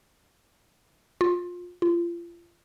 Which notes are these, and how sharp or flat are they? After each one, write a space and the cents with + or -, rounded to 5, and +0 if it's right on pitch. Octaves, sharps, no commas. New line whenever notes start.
F4 +20
F4 -30